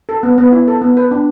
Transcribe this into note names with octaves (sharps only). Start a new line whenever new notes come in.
A4
B3
B3
E4
A4
B3
B4
D4